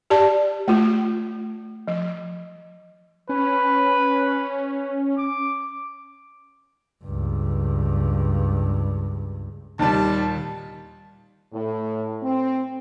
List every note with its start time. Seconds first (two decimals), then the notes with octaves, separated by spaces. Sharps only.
0.10 G4 D5 A5
0.68 A3 F4
1.88 F3
3.29 C#4 B4
5.18 D6
7.04 C#2 G2
9.79 D#2 A#2 D#3 G3 A5
11.53 A2
12.23 C4